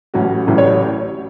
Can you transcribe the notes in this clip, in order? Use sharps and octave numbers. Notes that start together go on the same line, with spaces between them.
A1 A2 F#3 C#4 F#4
A1 A2 F#3 C#4
C#5